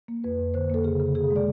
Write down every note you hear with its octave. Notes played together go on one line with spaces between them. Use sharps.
A#3
F2 B4
F2
D3 C5
A#3 A4
C#3 G#4
C#3
C3 G#4
G#3
D5